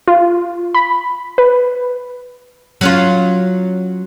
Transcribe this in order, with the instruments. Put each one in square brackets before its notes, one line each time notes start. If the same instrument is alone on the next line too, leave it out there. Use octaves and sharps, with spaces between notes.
[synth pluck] F4
B5
B4
[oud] F#3 C#4 F4